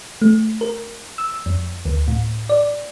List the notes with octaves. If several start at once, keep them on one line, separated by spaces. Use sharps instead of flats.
A3
A#4
E6
F2
D2
A2
D5